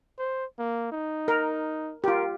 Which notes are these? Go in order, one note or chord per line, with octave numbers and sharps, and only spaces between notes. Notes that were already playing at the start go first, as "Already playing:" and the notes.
C5
A#3
D#4
A#4
F4 G4 A#4